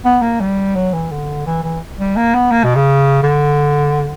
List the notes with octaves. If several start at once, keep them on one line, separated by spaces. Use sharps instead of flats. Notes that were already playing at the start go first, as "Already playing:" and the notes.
B3
A#3
G3
F#3
E3
D3
E3
E3
G3
A#3
B3
A#3
B2
C#3
D3